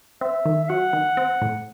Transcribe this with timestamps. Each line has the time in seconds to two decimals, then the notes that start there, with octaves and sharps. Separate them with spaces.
0.21 C4 E5
0.46 D#3
0.64 E5
0.69 F#3 F#5
0.93 D#3
1.17 C4
1.42 A2